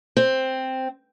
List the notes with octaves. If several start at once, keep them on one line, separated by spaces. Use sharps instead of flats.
C4